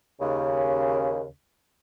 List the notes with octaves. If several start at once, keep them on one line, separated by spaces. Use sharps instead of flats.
D#2 C#3